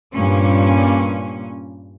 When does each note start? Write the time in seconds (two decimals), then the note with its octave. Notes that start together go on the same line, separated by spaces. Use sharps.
0.13 G2 A#2 C#4